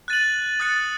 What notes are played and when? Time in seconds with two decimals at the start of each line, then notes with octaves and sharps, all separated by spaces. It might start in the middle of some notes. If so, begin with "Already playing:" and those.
0.08 F#6 A6 D#7 F#7
0.60 D#6 F#6 A6 C#7